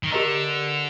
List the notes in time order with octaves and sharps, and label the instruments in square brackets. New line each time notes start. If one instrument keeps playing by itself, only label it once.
[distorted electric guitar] D#3
[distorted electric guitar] D3 [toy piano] G4 A#4 D#5 A#5